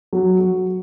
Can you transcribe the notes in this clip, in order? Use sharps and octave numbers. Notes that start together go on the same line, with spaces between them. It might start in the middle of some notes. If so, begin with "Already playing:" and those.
F#3
F#3